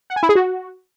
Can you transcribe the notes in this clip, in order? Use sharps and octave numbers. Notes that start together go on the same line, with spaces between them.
F#5
G#5
E4
G#4
F#4